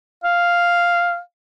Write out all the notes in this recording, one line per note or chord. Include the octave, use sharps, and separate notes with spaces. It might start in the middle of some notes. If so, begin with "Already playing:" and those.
F5